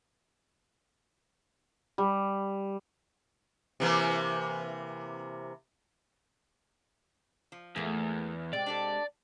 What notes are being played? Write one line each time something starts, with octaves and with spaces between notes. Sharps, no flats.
G3
C3 E3 A#3
F3
E2 A3 A#3
C3 G#3 C4 D5
D4 G4 A4